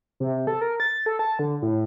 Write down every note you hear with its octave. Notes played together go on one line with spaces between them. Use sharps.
C3
A4
A#4
A6
A4
A5
D3
A2